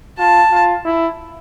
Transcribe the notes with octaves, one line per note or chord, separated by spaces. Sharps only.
F4 A5
F4
E4